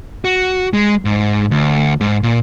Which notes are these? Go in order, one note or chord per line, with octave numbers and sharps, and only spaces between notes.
F#4
G#3
G#2
D2
G#2
A#2